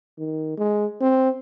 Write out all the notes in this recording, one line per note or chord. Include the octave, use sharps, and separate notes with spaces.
D#3
G#3
C4